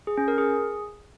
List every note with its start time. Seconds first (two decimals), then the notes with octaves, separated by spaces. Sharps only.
0.07 G#4
0.18 C#4
0.28 A#4
0.38 G#4